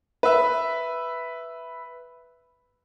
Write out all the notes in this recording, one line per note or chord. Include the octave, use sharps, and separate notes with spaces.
B4 E5